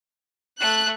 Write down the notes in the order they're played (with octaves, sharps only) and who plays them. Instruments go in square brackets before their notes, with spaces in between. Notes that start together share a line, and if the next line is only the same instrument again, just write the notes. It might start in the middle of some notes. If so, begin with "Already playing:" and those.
[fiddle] A3 [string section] F#6